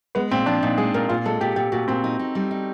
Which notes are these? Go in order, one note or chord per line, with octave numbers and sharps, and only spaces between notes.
G#3 B3
A#2 C4
F3 D4
A#2 D#4
G#3 G#4
A#2 A#4
A#2 F4
G#3 A4
A#2 G4
A#2 G4
A#2 F#4
A#2 C4
D#4
D#4
G3
D#4